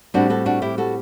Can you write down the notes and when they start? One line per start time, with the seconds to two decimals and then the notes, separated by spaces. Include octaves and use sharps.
0.14 A2 G3 C4 D4 F#4
0.30 F#4 A4
0.46 D4 F#4
0.62 E4 G4
0.78 F#4 A4